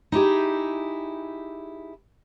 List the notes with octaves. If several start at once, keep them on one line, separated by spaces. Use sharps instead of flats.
D#4 E4 G4 G#4